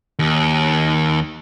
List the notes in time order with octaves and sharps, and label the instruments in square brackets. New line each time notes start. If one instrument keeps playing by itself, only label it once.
[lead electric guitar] D#2